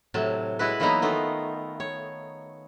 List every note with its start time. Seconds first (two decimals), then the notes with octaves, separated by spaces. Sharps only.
0.14 A2 C3 F#3 A5
0.59 G#3 E4 F#4 B4
0.80 E3 F#3 A#3 B3 D#4 E4
1.02 D#3 A3 B3 F4
1.80 C#5